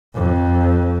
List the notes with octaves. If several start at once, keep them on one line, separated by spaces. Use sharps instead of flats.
F2